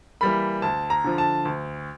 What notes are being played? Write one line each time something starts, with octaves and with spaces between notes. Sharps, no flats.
E3 G3 A#3 B5
D2 A5
A#5
D3 F3
A5
D2